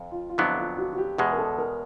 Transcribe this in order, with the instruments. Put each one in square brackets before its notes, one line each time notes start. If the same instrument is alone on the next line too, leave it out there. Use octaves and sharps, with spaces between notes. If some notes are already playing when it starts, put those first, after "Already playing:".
Already playing: [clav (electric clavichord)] F2
[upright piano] F4
F4
[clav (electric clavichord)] F2 D3 F#3 B3 D4 [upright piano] E4
[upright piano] F4
F#4
F#4
G4
[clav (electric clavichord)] E2 B2 G#3 [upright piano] G#4
[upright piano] A#4
A4
A#4